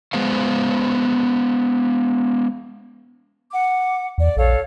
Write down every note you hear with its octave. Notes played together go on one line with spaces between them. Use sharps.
G#3 B3 C5 F5
F#5 D6
E2 D5
A#1 A4 C#5 F5